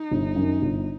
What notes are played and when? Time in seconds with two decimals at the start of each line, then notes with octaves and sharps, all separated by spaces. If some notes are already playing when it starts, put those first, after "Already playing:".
Already playing: D#4
0.11 G1
0.36 F#2 D#3
0.62 G1